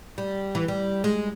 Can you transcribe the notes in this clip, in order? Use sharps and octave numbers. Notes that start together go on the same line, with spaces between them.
G3
E3
G3
G#3